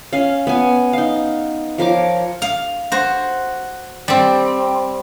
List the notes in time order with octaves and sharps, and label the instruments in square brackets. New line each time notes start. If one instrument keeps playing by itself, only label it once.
[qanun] C#4 F5
B3 G#5
D#4 F5
F3 A#4 C#5 D6
[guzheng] F5
F#4 C5
G3 C4